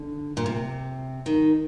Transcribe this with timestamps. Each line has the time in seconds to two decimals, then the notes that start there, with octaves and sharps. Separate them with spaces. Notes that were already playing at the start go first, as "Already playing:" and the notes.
Already playing: D3
0.37 A#2
0.46 C3
1.26 D#3